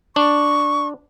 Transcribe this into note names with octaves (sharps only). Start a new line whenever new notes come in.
D4 C#6